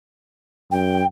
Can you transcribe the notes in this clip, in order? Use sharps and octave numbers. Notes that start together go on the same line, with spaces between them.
F#2 G5